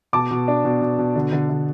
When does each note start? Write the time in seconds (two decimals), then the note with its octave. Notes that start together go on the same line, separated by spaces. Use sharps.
0.13 B2 A5 D6
0.31 B2
0.48 D4
0.65 B2
0.81 B2
0.98 B2
1.15 D3
1.32 D3
1.49 D3